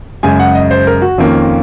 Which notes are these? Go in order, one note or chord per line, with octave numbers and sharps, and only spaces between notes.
F#2 C#3 G#3 G#5
F#5
D#5
C5
A#4
F#4
F2 D#3 A#3 C#4 F4